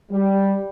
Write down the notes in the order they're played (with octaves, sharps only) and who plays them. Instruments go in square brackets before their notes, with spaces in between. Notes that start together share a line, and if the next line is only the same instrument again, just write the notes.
[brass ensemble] G3